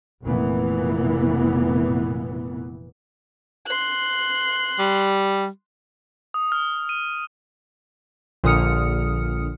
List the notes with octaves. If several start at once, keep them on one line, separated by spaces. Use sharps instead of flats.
F1 A#2 E3 B3
C6 F#6
G3
D#6
F6
D#7
A#1 A#2 D3 D#6 F6 C#7